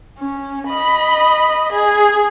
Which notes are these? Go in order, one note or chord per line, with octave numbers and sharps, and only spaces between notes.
C#4
D#5 B5
G#4